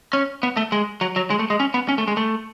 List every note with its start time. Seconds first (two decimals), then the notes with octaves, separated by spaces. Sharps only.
0.13 C#4
0.43 B3
0.57 A3
0.72 G#3
1.01 F#3
1.16 F#3
1.30 G#3
1.39 A3
1.50 G#3
1.60 C#4
1.74 B3
1.89 C#4
1.98 A3
2.08 G#3
2.17 A3